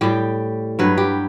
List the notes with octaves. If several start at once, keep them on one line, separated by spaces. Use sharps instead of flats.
A2 G3 G4
G2 F#3 B4
G4